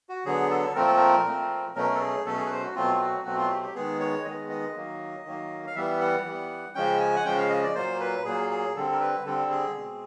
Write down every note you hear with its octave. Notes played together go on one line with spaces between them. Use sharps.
F#4
D3 F#3 B3 G#4
A4
A#2 F3 A3 C4 A#4
A4
A#4
A#2 F3 A3 C4
B2 F#3 A3 C#4 A#4
A4
G#4
B2 F#3 A3 C#4 A4
G#4
B4
C5
F#4
B2 F#3 A3 C4 F4
F4
F#4
B2 F#3 A3 C4 F#4
F4
G4
G4
D#3 G#3 B3 G#4
C#5
D#3 G#3 B3 D#5
D#5
D#3 F#3 A#3
D#3 F#3 A#3
F5
E3 G3 B3 E5
F#5
E3 G3 B3
C#3 F3 G#3 C#4 G5
G#5
F#5
C#3 F3 G#3 C#4 G5
F5
D#5
D5
A#2 F#3 A#3 C5
B4
A#2 F#3 A#3 G#4
G#4
D3 G3 C4 A4
A#4
B4
D3 G3 C4 A4
G#4
B2 G#3 C4